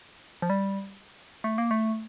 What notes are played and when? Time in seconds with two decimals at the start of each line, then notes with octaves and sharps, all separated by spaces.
0.42 F3
0.50 G3
1.44 A3
1.58 A#3
1.71 A3